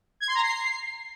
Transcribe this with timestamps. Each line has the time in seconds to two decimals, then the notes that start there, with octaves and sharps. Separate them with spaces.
0.20 G#6
0.28 C6
0.35 A#5
0.42 C7